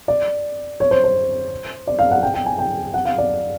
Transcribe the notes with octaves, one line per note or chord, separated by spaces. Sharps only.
D5
C#5
C5
C5
D5
F5
F#5
G5
G5
G#5
G5
F#5
F5
D5